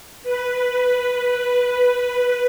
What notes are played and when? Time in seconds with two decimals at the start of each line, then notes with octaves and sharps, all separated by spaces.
0.23 B4
0.59 B4